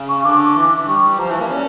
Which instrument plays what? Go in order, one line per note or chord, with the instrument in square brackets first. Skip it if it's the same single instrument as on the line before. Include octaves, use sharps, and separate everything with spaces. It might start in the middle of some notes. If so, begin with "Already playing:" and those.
Already playing: [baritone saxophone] C#3
[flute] C#6
[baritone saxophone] D3 [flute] D6
[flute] C#6
D6
[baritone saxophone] E3 [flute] D6
[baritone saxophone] G3 [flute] C#6
[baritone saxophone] F3 [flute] A#5
[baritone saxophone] E3 [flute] A5
[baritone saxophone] A#3
[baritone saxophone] C#4 [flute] D5